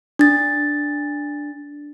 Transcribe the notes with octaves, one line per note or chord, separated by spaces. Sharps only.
D4 A6